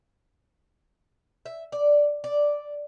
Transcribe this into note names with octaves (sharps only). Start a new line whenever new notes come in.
E5
D5
D5